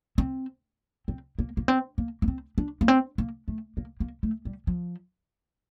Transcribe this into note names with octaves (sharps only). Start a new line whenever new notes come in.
C4
C4
A#3
A#3
C4
A#3
A#3
C4
D4
A#3
C4
A#3
A3
A#3
A#3
A3
G3
F3